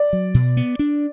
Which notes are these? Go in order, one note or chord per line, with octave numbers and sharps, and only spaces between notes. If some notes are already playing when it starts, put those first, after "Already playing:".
Already playing: D5
F#3
B2
B3
D4